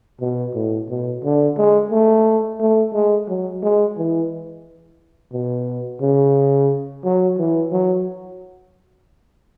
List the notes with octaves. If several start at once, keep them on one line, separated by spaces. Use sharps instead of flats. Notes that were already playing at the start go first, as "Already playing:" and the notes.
B2
A2
B2
D3
G#3
A3
A3
G#3
F#3
G#3
E3
B2
C#3
F#3
E3
F#3